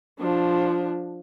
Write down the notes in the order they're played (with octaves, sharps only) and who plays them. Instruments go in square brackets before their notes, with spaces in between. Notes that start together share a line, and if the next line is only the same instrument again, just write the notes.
[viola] F3 D4